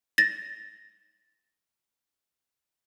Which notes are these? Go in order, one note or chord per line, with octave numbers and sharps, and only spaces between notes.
A6 A#6